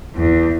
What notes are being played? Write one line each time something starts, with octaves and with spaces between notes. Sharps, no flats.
E2